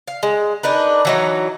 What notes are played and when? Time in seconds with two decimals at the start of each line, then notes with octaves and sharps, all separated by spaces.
0.08 F5
0.23 G#3
0.63 D4 D#4 A#4 B4
1.05 E3 F#3 D#4